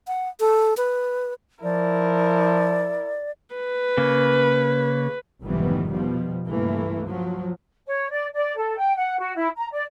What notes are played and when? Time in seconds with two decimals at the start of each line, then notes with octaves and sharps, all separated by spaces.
0.07 F#5
0.40 A4
0.77 B4
1.63 F3 E4 A#4 D5
3.55 B4
3.98 C#3 A#3
5.42 F1 G#2 D#3 E3 G3 B3
5.90 B2 F3 G3
6.46 C#2 G2 E3 A3 A#3
7.07 F3 F#3
7.87 C#5
8.12 D5
8.34 D5
8.56 A4
8.78 G5
8.96 F#5
9.19 F#4
9.36 E4
9.56 A#5
9.72 D5